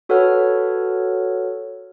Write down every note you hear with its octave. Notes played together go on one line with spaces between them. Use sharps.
F#4 A4 B4 C#5 F#5 F6